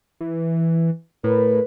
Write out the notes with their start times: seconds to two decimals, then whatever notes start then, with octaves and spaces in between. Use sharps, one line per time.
0.21 E3
1.24 A2 A#4 B4